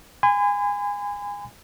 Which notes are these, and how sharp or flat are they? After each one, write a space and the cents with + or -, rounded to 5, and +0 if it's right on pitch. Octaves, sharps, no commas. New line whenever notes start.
G#5 -25 B5 +45